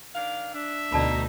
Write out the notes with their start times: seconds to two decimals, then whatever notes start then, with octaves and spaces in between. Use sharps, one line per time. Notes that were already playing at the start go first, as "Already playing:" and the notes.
0.15 D#3 D4 F5
0.54 D4 E5
0.92 D2 B2 D#4 D5 A5 B5